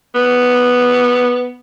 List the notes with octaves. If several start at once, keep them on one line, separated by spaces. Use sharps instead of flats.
B3